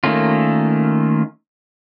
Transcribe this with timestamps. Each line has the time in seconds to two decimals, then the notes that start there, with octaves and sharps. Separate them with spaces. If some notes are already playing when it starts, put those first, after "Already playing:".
0.04 D#3 A3 A#3 C#4 F4